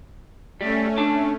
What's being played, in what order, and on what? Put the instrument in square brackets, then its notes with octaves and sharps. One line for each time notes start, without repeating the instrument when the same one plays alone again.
[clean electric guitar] G3 [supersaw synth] A3 C#4
[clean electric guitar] D4 A5